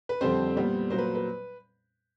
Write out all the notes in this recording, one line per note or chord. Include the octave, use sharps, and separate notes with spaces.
B4
F2 D3 G3 C4 C5
A#2 G3 B3
A#2 F#3 A#3 C5
B4
B4